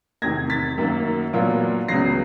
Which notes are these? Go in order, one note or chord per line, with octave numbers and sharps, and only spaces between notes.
E2 C3 D#3 G#6 A#6
A6 B6
F#2 D#3 F#3 A#3
A#2 F#3 B3 D4 F4
C#2 C#3 F#3 B3 A#6 C7